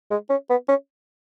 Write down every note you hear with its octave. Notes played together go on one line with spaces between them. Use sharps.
G#3
C#4
B3
C#4